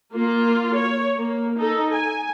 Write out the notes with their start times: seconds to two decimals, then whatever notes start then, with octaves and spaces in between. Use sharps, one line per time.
0.12 A#3 F4
0.76 C#5
1.16 A#3
1.58 D#4 A4
1.92 G#5